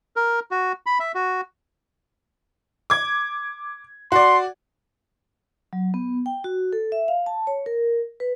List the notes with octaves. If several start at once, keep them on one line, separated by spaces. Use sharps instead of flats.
A#4
F#4
B5
E5
F#4
D6 G#6
F#4 D5 C6
F#3
B3
G5
F#4
A4
E5
F5
A5
C#5
A#4
B4